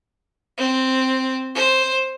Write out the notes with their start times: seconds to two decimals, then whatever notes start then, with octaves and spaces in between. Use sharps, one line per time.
0.58 C4
1.55 C5